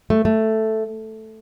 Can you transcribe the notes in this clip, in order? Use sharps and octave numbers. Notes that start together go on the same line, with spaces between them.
A3
A3